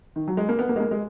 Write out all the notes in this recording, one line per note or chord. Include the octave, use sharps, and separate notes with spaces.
D#3
F#3
G#3
A#3
B3
A#3
G#3
A#3
G#3